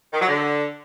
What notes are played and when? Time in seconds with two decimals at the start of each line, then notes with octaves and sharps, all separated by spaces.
0.13 D#3
0.20 F#3
0.28 D3